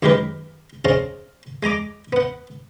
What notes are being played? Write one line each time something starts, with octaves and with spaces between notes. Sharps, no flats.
F#2 D#3 G#3 G4 A#4 B4
C4 C#4 G#4 D#5 F5 A5
G#3 G#5 A#5 D6
B3 F#5